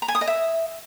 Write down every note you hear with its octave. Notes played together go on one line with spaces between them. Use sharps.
A#5
G#5
D#6
D#5
E5